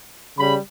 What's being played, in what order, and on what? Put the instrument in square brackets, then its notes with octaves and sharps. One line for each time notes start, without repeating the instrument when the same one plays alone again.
[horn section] C#3 G3 B5